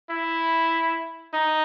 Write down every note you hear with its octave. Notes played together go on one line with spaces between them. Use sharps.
E4
D#4